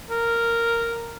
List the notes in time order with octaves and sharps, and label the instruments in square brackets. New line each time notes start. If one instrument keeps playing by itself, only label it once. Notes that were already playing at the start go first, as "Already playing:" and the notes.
[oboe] A#4